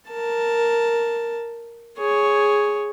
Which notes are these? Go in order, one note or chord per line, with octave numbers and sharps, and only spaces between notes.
A#4 A5
G#4 C#5